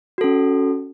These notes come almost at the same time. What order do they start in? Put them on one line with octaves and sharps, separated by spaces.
F#4 A4 C#4